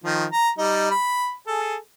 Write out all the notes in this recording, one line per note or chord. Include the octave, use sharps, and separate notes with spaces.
D#3 F3
A#5
G3 D#4
B5
G#4 A4